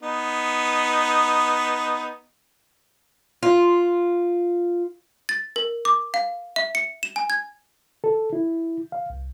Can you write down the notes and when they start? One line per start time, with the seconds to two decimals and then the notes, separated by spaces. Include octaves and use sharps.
0.03 B3 D#4
3.43 F4
5.29 A6
5.56 A#4
5.85 D6
6.14 F5
6.56 E5
6.75 C#7
7.03 E7
7.16 G#5
7.30 G#6
8.04 A4
8.33 E4
8.92 F5
9.10 C2